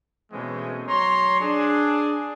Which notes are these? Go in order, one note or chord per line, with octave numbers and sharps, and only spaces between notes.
B2 E3 G#3 A3 C4 C#4
F#3 C#5 A#5 C6
D4 G#4